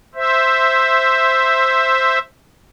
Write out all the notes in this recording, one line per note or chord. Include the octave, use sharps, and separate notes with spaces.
C5 E5